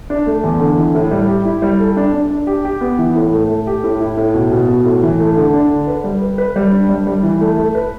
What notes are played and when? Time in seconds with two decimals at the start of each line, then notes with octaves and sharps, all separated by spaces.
0.10 D4
0.26 A3
0.44 E2
0.60 D3
0.78 E3
0.95 A2
1.11 G3
1.29 G4
1.45 E4
1.62 G3
1.80 A4
1.97 D4
2.13 D4
2.31 D4
2.47 G4
2.65 G4
2.81 B3
2.99 E3
3.16 A2
3.33 A3
3.49 A3
3.67 G4
3.84 A2
4.00 E4
4.17 A2
4.34 B2
4.52 B2
4.68 B2
4.85 A2
5.03 E3
5.19 A3
5.37 D3
5.54 D4
5.70 D3
5.87 B4
6.04 G3
6.22 B4
6.38 B4
6.56 G3
6.72 D4
6.89 G3
7.07 G3
7.23 E3
7.41 A3
7.57 A3
7.75 B4